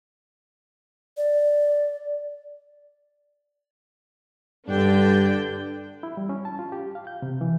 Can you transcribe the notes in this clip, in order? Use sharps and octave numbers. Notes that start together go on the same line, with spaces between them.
D5
G2 D3 D4 G5
E4
G3
C#4
A5
F4
G4
F5
G6
C3
E3